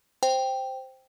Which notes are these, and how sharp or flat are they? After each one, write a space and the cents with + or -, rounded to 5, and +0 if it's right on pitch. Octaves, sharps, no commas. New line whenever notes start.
C5 +0 G5 +0